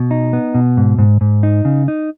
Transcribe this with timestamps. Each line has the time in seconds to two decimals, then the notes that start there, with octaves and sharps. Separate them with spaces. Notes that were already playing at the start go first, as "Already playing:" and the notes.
Already playing: B2
0.11 D#4
0.33 B3
0.55 B2
0.77 G#2
0.98 G#2
1.21 G#2
1.43 D#4
1.65 C#3
1.88 D#4